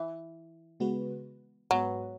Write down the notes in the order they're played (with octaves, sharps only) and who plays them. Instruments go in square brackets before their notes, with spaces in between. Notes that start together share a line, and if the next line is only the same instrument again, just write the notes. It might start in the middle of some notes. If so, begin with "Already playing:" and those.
Already playing: [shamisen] E3
[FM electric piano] C#3 G#3 B3 F#4 B4
[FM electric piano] G#2 G#3 B3 F#4 B4 [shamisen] F#3